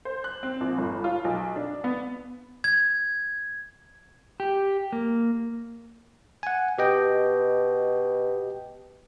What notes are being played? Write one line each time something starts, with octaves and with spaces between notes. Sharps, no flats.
C5
F#6
C4
A#1
G1
F4
B1
D4
B3
G#6
G4
A#3
F#5 G#5
B2 G4 D#5 G5